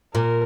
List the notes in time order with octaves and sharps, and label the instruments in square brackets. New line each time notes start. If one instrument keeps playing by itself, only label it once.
[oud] A#2 [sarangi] A#4